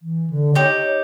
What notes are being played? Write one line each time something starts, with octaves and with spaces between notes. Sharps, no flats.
E3
D3
D#4 G4 C#5